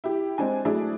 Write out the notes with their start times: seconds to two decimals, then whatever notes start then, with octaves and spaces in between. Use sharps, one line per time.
0.04 E4 G4
0.38 G#3 C4 D4 G#5
0.65 F#3 A3 D4 E4 G#4